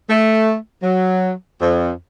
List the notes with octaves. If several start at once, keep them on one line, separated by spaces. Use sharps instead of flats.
A3
F#3
F2